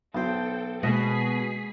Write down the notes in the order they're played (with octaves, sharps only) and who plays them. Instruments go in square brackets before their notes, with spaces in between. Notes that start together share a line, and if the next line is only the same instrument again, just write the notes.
[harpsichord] B1 C5 [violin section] A4 G5
[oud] B2 [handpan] G#3 A#3 [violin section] G#4 B6 C7 [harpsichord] D#5